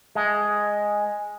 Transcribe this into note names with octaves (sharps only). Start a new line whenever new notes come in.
G#3